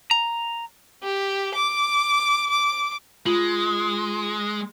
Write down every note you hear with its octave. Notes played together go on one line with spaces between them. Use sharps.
A#5
G4
D6
D6
G#3 F4 F#7